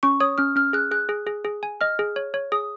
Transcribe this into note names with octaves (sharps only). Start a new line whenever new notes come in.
C#4 C#6
C#5 D#6
C#4 F6
C#4 F6
G#4 F#6
G#4 F#6
G#4
G#4
G#4
G#5
D#5 F6
G#4
C#5
C#5
G#4 D#6